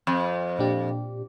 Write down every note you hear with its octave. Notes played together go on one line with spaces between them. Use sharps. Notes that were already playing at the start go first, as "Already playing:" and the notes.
F2
A#2 D4 G4